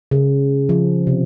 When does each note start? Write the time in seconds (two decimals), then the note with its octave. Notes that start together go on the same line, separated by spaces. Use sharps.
0.11 C#3
0.69 F3
1.07 C3